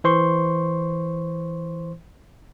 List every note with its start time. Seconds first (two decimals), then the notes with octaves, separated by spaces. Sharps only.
0.04 E3 C5 C6 C#6